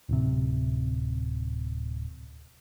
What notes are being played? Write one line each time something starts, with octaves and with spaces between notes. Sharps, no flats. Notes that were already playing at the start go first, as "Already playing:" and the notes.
D1 C3